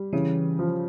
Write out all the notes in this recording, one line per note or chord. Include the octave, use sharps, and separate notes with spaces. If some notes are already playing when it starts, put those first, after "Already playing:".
Already playing: G3
C#3 E3
F3